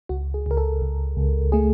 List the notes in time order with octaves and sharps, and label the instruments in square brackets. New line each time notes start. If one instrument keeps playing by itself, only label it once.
[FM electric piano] C#2 F#4
G#4
C#2 A#4
A4
C#2
C#2
A3 G#4